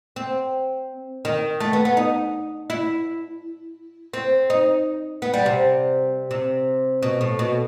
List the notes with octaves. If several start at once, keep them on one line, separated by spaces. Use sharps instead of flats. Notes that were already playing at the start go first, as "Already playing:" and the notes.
C4
D#3
A3
B3
B3
D#4
E4
C4
D#4
B3
G3
C3
C3
B2
A2
B2